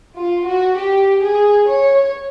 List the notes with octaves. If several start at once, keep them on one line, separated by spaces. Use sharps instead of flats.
F4
F#4
G4
G#4
C#5